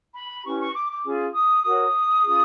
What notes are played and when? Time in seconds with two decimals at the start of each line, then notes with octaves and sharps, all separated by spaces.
0.15 B5
0.44 C#4 E4 G4 B4 C#6
0.59 C#6
0.74 D6
0.89 D6
1.04 C#4 F4 G#4
1.34 D#6
1.63 F#4 A#4 C#5 D#6
2.23 C#4 F4 G#4